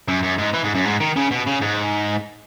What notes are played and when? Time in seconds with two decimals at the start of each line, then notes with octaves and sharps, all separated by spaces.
0.08 F#2
0.23 F#2
0.38 G#2
0.54 E3
0.64 G#2
0.75 F#2
0.85 G#2
1.00 D#3
1.16 C#3
1.31 B2
1.47 C#3
1.62 G#2